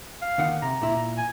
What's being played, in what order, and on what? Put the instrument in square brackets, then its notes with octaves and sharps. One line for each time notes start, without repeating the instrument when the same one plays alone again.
[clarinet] F5
[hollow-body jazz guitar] D#2 D#3 F#5
[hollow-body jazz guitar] C3 [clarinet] A#5
[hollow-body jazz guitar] A#2 E4
[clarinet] G#5